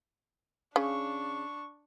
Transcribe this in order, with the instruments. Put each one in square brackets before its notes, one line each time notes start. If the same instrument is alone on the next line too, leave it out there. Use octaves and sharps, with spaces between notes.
[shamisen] C#3 [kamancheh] D4 C#6